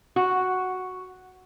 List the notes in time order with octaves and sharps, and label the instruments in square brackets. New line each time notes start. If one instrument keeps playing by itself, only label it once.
[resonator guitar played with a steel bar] F#4